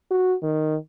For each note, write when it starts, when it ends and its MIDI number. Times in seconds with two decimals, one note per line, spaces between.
0.11 0.34 66
0.43 0.76 51